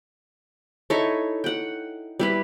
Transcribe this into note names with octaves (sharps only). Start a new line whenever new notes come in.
D#4 E4 A4 C#5
F#5 G5
G3 E4 B4